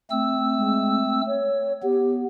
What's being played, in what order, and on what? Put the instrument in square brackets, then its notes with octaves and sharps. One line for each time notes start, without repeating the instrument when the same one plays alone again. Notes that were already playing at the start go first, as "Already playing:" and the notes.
[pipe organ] A3 C4 E6
[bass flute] G#3
C#5
[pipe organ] B3 [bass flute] G4